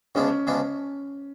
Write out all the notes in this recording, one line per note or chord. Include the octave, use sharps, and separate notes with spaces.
D2 C#3 G#3 B3 C#4 D4
D2 C#3 G#3 B3 D4